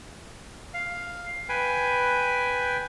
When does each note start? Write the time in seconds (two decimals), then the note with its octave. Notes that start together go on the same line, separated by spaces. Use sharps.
0.74 F5
1.49 B4 G5 G#5